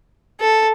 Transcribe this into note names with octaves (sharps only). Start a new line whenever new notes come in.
A4